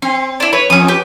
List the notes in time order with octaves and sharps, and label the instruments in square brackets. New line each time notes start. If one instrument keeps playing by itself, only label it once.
[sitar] C4 [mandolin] C6
[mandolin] D4 E4
[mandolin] B4 [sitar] C#5
[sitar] F2 [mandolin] C#4 D#6
[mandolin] G4 B4